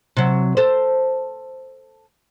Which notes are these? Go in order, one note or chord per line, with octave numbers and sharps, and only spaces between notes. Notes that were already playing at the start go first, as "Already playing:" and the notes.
C3 F#3
A4 C5